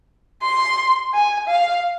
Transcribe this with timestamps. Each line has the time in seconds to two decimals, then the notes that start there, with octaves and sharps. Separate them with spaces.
0.42 C6
1.13 G#5
1.48 F5